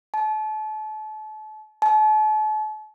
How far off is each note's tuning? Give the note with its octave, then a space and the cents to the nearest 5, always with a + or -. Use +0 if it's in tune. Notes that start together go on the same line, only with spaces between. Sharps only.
A5 -35
A5 -40